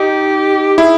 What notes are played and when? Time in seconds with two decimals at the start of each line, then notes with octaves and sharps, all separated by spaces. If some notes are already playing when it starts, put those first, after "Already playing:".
Already playing: D#4 G4
0.78 E4 G#4